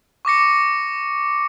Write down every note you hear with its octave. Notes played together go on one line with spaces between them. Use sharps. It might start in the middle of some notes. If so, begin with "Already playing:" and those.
C#6 D6 A#6 C#7